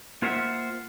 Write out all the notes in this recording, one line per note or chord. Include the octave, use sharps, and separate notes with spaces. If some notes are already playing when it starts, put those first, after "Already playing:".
A#3 F4 A#4 C5 E5 F#5